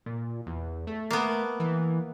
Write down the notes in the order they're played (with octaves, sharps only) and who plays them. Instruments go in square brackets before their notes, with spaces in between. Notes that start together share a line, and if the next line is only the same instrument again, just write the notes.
[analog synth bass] A#2
E2
A3
[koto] A#3 B3
[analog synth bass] E3